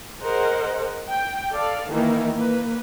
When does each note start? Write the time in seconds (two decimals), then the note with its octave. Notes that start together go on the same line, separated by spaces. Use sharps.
0.21 G#4 A#4 C5 D#5 F#5
1.09 G5
1.52 A4 D5 F5
1.90 D#3 E3 A#3 E4
2.34 A#3 B4